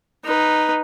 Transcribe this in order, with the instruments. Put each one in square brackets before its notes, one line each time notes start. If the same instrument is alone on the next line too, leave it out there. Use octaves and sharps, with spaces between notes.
[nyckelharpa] D#4 B4